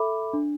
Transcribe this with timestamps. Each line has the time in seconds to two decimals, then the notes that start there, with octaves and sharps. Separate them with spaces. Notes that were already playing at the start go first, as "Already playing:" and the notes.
Already playing: A4 E5 B5 D6
0.33 D4